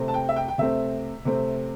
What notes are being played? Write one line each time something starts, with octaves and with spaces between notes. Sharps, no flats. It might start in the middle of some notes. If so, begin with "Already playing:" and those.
Already playing: C3 A3 C4
A5
G5
E5
G5
G5
C3 A3 C4 E5
C3 A3 C4